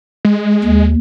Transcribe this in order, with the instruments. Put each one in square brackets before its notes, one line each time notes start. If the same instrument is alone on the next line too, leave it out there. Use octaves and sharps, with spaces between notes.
[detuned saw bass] G#3
[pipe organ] D#2